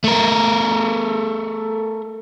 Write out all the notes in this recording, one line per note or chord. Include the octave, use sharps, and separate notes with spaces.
A3 A#4